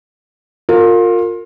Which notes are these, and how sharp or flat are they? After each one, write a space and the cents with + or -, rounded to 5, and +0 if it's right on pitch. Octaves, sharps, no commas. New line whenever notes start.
F4 +25 A#4 -30